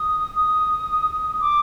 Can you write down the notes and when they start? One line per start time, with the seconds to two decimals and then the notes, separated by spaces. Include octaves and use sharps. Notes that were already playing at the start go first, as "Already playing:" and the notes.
Already playing: D#6
0.36 D#6
1.41 D6